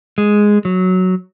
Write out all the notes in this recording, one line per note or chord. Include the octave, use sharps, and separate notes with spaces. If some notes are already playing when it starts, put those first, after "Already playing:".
G#3
F#3